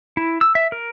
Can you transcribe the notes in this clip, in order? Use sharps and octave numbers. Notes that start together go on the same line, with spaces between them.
E4
E6
E5
A#4